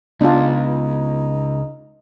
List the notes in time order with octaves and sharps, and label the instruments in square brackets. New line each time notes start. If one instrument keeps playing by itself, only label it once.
[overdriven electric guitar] C#2 [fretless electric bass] B3 [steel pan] D4 F4 [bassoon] D#4